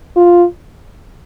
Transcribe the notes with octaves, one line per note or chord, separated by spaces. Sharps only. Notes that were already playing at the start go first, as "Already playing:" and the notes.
F4